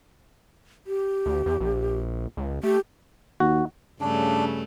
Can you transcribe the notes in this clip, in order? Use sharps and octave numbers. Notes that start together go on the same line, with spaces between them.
G4
D2
E2
A#1
C#2
A3 G4
D#2 F#4
G2 C#3 A3 D4